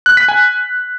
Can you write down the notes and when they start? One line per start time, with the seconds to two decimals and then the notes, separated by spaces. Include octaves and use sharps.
0.06 F#6
0.17 B6
0.28 G#5